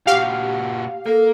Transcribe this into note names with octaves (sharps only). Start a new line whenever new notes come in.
A#2 F#4 G4 F5
A#3 A4